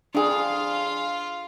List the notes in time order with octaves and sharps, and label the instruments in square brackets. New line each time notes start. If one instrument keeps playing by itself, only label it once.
[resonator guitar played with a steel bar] F2 G#4 [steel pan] D4 [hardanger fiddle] F4 F5